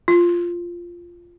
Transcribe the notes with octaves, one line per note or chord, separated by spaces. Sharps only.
F4